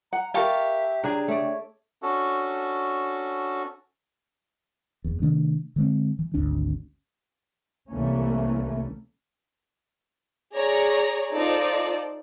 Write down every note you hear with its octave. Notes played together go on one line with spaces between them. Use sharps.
F#5 A#5
G4 A#4 E5 F5 A5 C#6
C#3 D4 G#4 A#5
A3 C#5 D5
C#4 D4 F#4 A4
F#1 E2
C3 D#3 A3 D4
D3 G#3 C4
E3
G#1 D2 C#4 D4
C2 E3 A3 A#3 C#4
G#4 C#5 D5 A#5
D#4 F4 A4 C5 D5